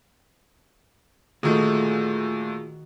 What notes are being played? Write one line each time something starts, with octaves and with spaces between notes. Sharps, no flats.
A#2 D#3 A3 F4 F#4 G#4